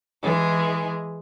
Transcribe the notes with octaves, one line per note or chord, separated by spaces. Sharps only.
E3 G#3 G#4